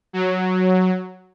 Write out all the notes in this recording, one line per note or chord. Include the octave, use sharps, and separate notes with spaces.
F#3